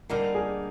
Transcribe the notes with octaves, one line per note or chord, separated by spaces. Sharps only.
D3 G3 A#3 D#4 A#4
G#4